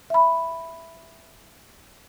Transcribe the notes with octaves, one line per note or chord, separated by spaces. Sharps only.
E5 B5